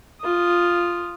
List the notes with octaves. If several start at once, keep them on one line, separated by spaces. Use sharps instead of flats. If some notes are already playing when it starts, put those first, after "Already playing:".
F4 D#6